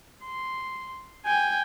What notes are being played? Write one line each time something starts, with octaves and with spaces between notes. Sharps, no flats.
C6
G5 G#5